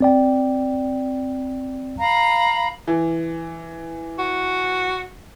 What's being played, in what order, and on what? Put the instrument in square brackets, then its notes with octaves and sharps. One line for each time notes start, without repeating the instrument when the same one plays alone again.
[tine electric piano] C4 D5 G5
[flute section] F5 A#5 B5
[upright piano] E3
[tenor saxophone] F#4